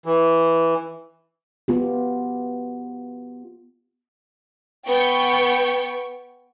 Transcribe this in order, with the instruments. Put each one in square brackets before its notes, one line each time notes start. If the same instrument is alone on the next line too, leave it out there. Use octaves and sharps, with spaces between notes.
[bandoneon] E3
[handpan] B3 F4 G4
[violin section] B3 G5 C#6